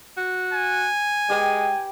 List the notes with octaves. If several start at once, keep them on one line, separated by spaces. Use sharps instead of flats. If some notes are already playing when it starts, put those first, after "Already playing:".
F#4
G#5
G#3 G4 B4 G5